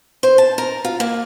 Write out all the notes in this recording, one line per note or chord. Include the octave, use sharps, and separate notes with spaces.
C5
A5
A#4
F4
A#3